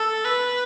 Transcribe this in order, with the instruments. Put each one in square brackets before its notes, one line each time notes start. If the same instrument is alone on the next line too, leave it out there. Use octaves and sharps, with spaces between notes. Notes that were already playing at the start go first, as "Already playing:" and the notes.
Already playing: [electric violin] A4
B4